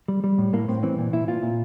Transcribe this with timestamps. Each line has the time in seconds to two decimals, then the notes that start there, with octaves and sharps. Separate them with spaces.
0.08 G3
0.24 G3
0.38 A2
0.53 A2 A#3
0.68 A2 C4
0.83 E3 C4
0.98 A#2
1.13 A#2 E4
1.28 A#2 F4
1.43 A#2